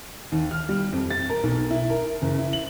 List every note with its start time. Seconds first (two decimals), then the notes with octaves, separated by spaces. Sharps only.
0.32 D#2
0.51 F6
0.69 G3
0.93 F2
1.10 A6
1.30 A#4
1.43 B1
1.71 E4
1.90 A#4
2.22 F#1
2.38 E4
2.53 F#7